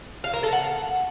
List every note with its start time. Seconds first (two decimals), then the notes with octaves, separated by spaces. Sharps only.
0.24 F5
0.33 A#4
0.43 A4
0.53 F#5